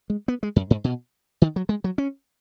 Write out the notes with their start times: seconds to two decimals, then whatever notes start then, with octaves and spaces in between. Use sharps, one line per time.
0.10 G#3
0.28 B3
0.43 G#3
0.56 F#2
0.70 G#2
0.84 B2
1.42 D#3
1.56 F#3
1.69 G#3
1.84 F#3
1.98 C#4